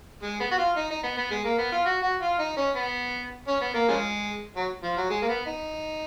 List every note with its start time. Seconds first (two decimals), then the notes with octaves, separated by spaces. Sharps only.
0.22 G#3
0.40 B3
0.51 F#4
0.58 F4
0.76 D#4
0.90 D#4
1.03 B3
1.17 B3
1.31 G#3
1.44 A#3
1.58 B3
1.72 F4
1.85 F#4
2.02 F#4
2.21 F4
2.39 D#4
2.57 C#4
2.75 B3
3.47 C#4
3.61 B3
3.74 A#3
3.88 C#3 F3 G#3
4.56 F#3
4.83 F3
4.97 F#3
5.10 G#3
5.22 A#3
5.28 B3
5.46 D#4